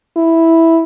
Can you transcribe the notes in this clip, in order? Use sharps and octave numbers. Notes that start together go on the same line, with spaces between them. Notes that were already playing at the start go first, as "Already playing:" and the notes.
E4